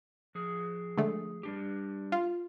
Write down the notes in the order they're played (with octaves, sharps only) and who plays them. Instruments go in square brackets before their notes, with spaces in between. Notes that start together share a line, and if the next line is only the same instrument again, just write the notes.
[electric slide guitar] F3 G#4
[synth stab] D3 G#3 A3
[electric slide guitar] G3 D4 G4
[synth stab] F4